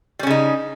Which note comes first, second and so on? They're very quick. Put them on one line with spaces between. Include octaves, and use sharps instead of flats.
G3 C#4 C#3 D#4